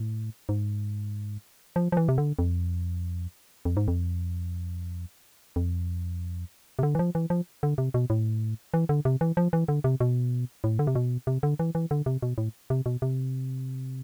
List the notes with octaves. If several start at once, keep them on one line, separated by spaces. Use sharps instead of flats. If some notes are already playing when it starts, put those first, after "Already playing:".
Already playing: A2
G#2
F3
F3
E3
C3
D3
F2
F2
G#2
F2
F2
C3
D3
E3
F3
E3
F3
D3
C3
B2
A2
E3
D3
C3
E3
F3
E3
D3
C3
B2
A2
D3
C3
B2
C3
D3
E3
E3
D3
C3
B2
A2
C3
B2
C3